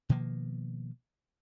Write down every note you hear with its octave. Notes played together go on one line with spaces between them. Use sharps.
B2 D#3 F3 A#3